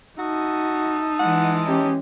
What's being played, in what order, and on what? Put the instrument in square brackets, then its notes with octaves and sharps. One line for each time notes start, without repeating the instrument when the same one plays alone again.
[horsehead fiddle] D#4 [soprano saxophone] F#4 [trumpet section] E5 A5 D#6
[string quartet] E3 G#3 [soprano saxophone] F#5
[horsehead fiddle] C#4 G4 [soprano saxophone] D#4